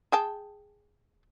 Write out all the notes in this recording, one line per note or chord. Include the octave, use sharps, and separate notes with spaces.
G#4 G5 A5